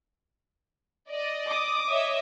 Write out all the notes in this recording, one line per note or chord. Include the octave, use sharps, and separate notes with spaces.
D5 D#5
D6 D#6
C#5 D#5 E5